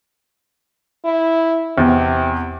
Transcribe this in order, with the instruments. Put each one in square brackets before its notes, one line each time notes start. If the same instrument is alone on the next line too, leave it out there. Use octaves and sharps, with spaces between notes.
[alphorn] E4
[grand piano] E2 [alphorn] C3